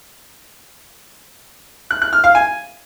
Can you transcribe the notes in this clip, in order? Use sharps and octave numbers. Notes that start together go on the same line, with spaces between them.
F#6
F#6
F6
F5
G#5